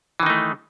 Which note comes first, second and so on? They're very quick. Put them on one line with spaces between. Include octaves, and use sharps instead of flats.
E3 D#3 D#4 A3